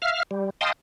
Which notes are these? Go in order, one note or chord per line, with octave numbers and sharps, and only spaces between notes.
E5 F5 F6
G3
D#5 F5 G5 A5 C6 D#6